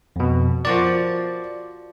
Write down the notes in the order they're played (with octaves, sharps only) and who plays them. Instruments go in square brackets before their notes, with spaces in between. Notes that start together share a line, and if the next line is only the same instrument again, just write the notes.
[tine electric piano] F2 B2
[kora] F3 F#4 A#4 [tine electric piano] D5